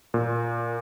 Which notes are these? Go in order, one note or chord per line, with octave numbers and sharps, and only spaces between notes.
A#2